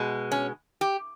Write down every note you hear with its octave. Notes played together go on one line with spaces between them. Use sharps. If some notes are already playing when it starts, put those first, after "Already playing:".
Already playing: B2 G#3
C#4
G4